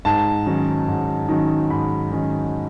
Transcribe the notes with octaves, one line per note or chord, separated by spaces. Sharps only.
G#2 A5
D#3 F#3 C#4
G#2
D#3 F#3 C#4
G#2 B5
D#3 F#3 C#4